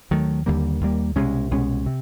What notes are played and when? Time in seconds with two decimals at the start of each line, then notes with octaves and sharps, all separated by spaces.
0.11 D#2 D#3 F#3 A3
0.46 D#2 D3 G3 A#3
0.81 D#2 D3 G3 A#3
1.16 C2 B2 G#3 C#4
1.51 C2 B2 G#3 C#4
1.86 C3